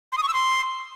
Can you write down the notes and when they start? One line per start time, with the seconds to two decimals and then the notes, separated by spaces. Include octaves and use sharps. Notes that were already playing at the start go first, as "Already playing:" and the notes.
0.12 C6
0.18 D#6
0.23 C#6
0.28 E6
0.33 C6